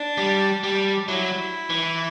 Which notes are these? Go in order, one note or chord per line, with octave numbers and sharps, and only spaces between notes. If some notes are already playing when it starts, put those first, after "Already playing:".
Already playing: D4
G3
G3
F#3 E4
E3